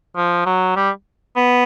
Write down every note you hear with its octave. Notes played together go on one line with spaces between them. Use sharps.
F3
F#3
G3
B3